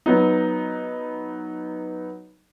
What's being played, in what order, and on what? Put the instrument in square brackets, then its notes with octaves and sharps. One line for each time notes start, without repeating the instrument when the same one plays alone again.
[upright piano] F#3 B3 D#4